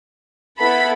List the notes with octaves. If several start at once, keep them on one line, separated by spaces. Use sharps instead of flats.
B3 E4 A4 B5